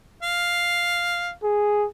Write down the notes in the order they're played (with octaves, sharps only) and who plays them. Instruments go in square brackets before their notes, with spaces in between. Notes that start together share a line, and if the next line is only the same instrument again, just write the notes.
[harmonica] F5
[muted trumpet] G#4